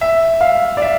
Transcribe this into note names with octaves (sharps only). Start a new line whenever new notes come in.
E5
F5
D5
E5